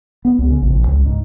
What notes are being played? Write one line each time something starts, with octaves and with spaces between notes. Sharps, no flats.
B3
C#2
C#3
A#1
A#1
C#2
G#2